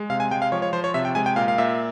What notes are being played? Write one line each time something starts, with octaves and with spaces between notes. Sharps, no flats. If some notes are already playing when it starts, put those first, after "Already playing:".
Already playing: G#3
C3 F5
G#5
G#3 G5
F5
F3 C#5
C#5
F3 C5
C#5
C3 E5
G5
G#3 G#5
G5
A#2 F5
F5
A#2 E5